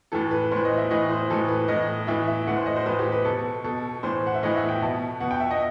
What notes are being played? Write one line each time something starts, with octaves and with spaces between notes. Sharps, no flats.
A2 E3 A4
B4
A2 E3 C5
D#5
E5
A2 E3 D#5
C5
A2 E3 A4
B4
A2 E3 D#5
A2 E3 E5
E5
A2 E3 F#5
C5
D#5
C5
A2 E3 B4
G4
B4
B2 A4
B2 A4
A2 E3 C5
F#5
E5
A2 E3 D#5
E5
G5
B2 A5
B2 F#5
G5
E5
D#5